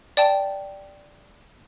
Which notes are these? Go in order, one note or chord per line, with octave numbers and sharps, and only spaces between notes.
D5 G5 A5